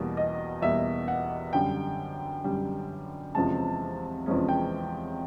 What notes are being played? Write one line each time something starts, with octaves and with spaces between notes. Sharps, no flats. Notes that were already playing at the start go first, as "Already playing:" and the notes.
Already playing: E2 B2 G3 A#3
D#5
E2 B2 G3 A#3 E5
F#5
F#2 D3 G3 G5
F#2 D3 G3
E2 C3 F3 G#3 C#4 A5
E2 C3 F3 G#3 C#4
G5